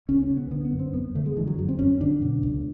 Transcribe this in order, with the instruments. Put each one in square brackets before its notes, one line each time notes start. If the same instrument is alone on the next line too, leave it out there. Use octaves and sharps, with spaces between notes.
[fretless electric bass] C#2 C#4
C#4
C#3
B3
D3 B3
B3
F#2
C4
F#2 B3
D3 A3
G#3
D3 E3
F#3
F#2 F#3
C4
F#2 C#4
D3 D4
B2
C#2